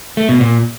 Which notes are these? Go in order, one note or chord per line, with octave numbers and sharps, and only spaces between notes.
A3
B2
A#2